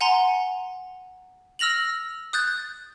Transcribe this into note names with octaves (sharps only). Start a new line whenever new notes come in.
F#5 G#5 A#5 C6
E6 F6 A#6 F7 F#7
D#6 F#6 G6 A6